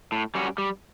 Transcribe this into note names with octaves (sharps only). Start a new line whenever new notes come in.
A2
G3 C#4 F#4
G3